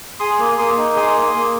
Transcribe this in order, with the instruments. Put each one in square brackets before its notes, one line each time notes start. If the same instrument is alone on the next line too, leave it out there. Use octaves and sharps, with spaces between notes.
[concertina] G#4 C6 D#6
A#3
A#3 C6 D#6
D#4
G#4 C6 D#6
A#3
A#3